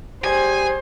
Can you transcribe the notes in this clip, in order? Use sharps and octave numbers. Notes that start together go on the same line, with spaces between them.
G3 G4 G#4 C5 G#5